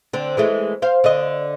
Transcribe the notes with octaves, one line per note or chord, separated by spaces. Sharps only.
D3 C4
E3 G#3 A3
C5 F5
D3 D#5